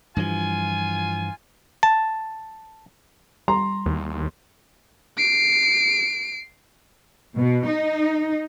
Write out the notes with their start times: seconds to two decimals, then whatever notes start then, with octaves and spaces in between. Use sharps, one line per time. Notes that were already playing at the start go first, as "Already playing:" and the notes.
0.17 G2 E3 F3 F4 G#5
1.83 A5
3.48 G3 A#5 C6
3.86 D#2
5.18 C7 D7
7.36 B2
7.66 D#4